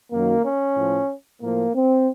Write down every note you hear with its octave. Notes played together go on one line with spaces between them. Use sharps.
F#2 D#3 F#3 A#3
C#4
A2 F3
A2 F3 A#3
C4